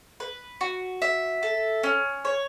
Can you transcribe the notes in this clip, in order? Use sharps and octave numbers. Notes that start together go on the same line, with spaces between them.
B4
F#4
E5
A4
C#4
C#5